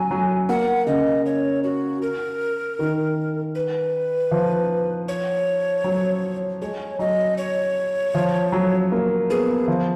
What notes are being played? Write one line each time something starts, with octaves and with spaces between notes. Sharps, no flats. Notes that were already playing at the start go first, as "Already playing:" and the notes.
Already playing: F#3 G#5
F#3
A#3 F#5
C#3 D#5
C#5
F#4
A#4
D#3
B4
F3
C#5
F#3
G#3 C#5
F#3 D#5
C#5
F3
F#3
A#3
B3 G#4
F3